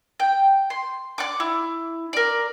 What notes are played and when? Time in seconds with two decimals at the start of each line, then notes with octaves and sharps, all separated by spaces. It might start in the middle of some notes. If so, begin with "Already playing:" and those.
0.20 G5
0.70 C6
1.18 D5 F#5 D6
1.40 E4
2.13 A#4 D5